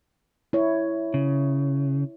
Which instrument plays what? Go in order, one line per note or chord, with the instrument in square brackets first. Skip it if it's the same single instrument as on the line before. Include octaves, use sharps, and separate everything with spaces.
[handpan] E4 C#5
[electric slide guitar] C#3